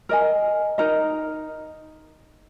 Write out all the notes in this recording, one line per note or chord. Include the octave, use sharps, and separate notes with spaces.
A#4 D#5 G#5
D#4 A#4 D#5 A#5